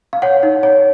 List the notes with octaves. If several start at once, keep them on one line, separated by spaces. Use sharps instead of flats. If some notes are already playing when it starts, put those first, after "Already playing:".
F5
C#5 F#5
D#4
C#5